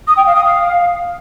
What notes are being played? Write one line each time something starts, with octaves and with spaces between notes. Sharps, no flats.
D#6
G5
F5
D#6
F5